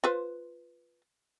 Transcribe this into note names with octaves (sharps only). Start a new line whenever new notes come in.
F4 B4 C5